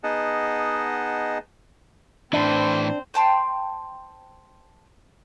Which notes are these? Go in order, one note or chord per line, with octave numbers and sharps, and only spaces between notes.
B3 D#4 G#4 D#5 F#5 A5
A2 E3 C4 D4 C5
C5 G5 A5 C6